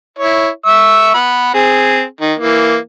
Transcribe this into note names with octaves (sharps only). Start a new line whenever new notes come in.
E4 C#5
E5 C#6 E6
F#5 B5
C4 G#4
D#3
E3 A#3